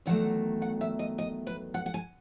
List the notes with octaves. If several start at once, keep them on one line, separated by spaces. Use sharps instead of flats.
E2 D#3 F#3 A3 F#5
F#5
E5
D#5
D#5
B4
F#5
F#5
G#5